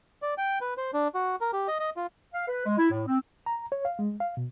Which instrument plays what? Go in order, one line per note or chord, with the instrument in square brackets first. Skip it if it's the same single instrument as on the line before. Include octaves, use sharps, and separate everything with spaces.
[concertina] D5
G5
B4
C5
D4
F#4
A#4
G4
D#5
D#5
F4
[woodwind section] F5
B4
G#3
E4
A2
C4
[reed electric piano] A#5
C#5
F5
G#3
F5
B2